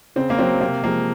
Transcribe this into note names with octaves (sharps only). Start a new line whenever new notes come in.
C#3 C4
A#3
F#3 C4
C3 A#3
F3 G#3 A#3